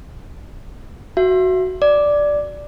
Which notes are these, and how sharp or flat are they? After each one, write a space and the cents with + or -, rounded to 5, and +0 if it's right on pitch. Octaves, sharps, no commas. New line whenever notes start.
F#4 +0 E5 +25
D5 +0 D6 +0